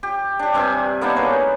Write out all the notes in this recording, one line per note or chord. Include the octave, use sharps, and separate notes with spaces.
G4
D4 G4
G2 C3 E5 G#5
A#3 B3 D4 D#4
B3 G#4 B4 C#5